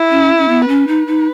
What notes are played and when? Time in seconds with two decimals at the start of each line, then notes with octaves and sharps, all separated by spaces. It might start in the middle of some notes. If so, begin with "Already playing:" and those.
Already playing: E4
0.10 C#4
0.38 C#4
0.48 B3
0.68 C#4 B4
0.87 D#4
1.06 D#4